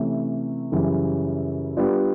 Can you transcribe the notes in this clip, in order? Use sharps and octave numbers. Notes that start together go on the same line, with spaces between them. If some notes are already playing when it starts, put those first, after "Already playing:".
Already playing: C3 E3 A3 C#4
F#2 C#3 E3 G3
G3 B3 D4 F4